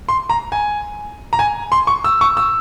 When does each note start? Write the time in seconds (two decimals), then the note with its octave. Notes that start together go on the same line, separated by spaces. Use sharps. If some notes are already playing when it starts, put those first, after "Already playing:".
0.09 C6
0.30 A#5
0.52 G#5
1.33 A#5
1.39 G#5
1.72 C6
1.87 C#6
2.04 E6
2.21 C#6
2.37 E6